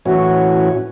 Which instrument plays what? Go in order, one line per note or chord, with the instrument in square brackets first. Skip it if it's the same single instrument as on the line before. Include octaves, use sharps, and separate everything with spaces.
[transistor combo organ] A2 E3 C#4 [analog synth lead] F#4